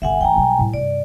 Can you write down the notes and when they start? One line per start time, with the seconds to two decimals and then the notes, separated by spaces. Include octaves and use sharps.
0.02 G1 D3 E5 F#5 G#5
0.21 E3 A3 G5 G#5 A#5
0.36 B1 G3
0.59 A2 G3
0.73 G2 C3 D5